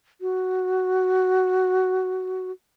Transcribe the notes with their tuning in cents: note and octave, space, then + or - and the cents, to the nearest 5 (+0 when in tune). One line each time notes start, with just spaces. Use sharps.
F#4 +5